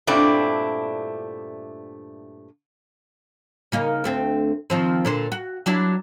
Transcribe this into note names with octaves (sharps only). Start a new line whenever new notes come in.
G2 A#2 A3 C4 D4 E4
C#3 A#3 D#4
D2 A3 C4
D#3 F3 C4
A#2 D3 C5
F#4
F#3 D4 E4